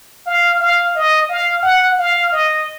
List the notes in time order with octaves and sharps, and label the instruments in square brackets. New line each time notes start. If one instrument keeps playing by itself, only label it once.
[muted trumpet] F5
F5
D#5
F5
F#5
F5
D#5